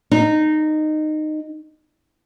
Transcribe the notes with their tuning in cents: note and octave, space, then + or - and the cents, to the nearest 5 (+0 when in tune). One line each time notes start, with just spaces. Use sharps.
D#4 -15